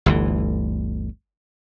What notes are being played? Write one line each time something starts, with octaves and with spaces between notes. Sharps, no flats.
G1 D2 E3